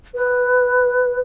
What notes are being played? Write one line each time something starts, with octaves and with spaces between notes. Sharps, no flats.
B4